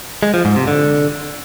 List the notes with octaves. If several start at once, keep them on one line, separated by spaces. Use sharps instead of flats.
G#3
F3
G#2
C3
D3